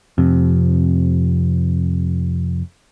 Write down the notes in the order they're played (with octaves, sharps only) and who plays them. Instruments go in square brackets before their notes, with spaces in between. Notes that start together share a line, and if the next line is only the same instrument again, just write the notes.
[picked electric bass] F2 C3